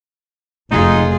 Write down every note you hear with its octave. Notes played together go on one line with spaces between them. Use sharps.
F1 G#3 D#4 F4 G#4